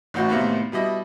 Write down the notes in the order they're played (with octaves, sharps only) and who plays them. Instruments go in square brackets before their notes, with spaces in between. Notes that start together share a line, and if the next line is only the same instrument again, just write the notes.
[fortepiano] A1 A2 D#4 F#4
A2 C3 D#3 A#3 B3
B2 G3 E4 D#5